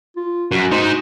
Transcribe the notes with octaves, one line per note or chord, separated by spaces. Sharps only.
F4
F#2 F#4
D#4 C5